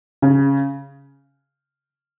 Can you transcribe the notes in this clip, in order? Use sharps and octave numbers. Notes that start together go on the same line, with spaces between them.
C#3